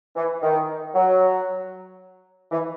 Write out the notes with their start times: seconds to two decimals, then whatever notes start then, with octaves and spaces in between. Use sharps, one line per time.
0.16 E3
0.43 D#3
0.95 F#3
2.52 E3